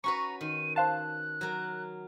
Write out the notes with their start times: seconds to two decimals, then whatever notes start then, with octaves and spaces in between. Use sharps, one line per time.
0.04 C#4 F#4 B4 A#5 C#6
0.41 D#3 D#7
0.76 C5 F5 A5 F#6
1.41 F#3 A#4